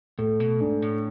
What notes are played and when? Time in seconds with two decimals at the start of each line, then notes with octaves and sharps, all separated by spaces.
0.18 A2 A3
0.40 B2
0.60 G#2 D4
0.82 A2